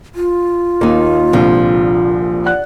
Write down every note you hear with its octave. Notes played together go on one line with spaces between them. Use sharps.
F4
D#2 A#3 D#4
C2 A#2 D3 F3
D5 F#5 F#6